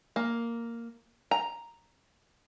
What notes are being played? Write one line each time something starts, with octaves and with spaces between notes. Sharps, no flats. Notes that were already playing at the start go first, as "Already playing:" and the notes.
A#3
A#5